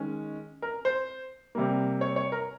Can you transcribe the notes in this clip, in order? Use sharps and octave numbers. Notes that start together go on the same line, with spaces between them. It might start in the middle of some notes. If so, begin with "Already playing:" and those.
Already playing: D#3 G#3 C#4
A#4
C5
C3 G3 A#3
C#5
C#5
A#4